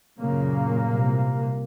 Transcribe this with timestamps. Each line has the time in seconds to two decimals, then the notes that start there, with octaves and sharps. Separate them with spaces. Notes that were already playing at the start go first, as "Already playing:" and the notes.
0.19 F#2 A#2 C#3 A#3
0.88 C2 C3